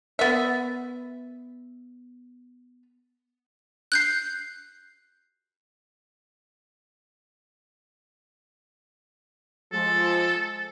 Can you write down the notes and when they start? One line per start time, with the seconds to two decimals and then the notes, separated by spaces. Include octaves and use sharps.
0.19 B3 E5
3.92 F#6 G6 C7
9.72 F3 G#3 A4